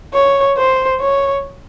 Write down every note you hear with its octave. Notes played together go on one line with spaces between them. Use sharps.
C#5
C5
C#5